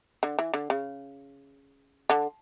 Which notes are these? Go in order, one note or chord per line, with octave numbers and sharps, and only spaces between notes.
D3
E3
D3
C#3
D3